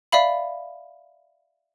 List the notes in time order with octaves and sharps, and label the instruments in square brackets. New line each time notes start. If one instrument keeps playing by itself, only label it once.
[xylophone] D5 E5 F5 B5